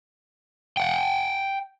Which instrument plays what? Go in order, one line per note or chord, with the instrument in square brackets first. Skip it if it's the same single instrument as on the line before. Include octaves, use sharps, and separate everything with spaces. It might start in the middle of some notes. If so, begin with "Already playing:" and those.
[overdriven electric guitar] F#5 G5